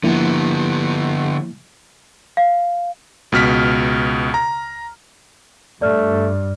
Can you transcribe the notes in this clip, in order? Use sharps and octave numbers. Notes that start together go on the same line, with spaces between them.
D3 F3 A#3 B3 E4
F5
C#2 B2 F6 B6
A#5
G2 A3 D5 F6